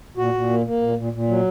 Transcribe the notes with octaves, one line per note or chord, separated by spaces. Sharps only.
A#2 F#4
A#2
A#3
A#3
A#2
A#2
A#2
F#3